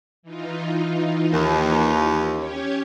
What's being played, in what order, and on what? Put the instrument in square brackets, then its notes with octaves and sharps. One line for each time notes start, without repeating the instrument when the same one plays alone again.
[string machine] E3 D#4 F4
[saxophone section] D#2
[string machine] C#4 G4 C#5